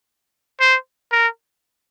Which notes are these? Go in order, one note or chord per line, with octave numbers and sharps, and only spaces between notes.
C5
A#4